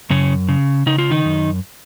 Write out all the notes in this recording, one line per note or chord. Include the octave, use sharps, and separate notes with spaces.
F#2 C#3 C#4
C#3
C#3 D#4
F4
D#3 D#4
F#2